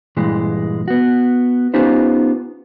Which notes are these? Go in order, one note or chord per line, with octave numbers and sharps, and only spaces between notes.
G2 A#2 E3 G#3
B3 F#4
B3 C#4 D#4 F4 G4 C5